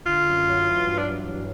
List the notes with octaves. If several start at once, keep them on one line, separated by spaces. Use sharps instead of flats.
D3 F4
F#2
F#3
E3
G2
D4